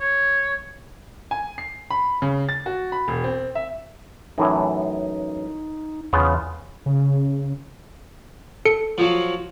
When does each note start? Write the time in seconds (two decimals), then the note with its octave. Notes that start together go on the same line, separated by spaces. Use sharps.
0.01 C#5
1.31 G#5
1.58 C7
1.91 B5
2.22 C#3
2.49 A6
2.66 F#4
2.92 B5
3.08 E1
3.24 C4
3.55 E5
4.38 F#2 A2 E3 D#4
6.13 E2 C#3 B3 F4
6.86 C#3
8.65 A4 C#7
8.98 F3 F#3